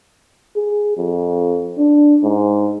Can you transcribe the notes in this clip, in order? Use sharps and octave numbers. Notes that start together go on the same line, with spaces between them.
G#4
F2
D4
G#2